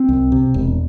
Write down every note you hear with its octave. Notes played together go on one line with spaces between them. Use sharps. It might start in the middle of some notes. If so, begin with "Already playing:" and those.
Already playing: C4
C2
C3
E1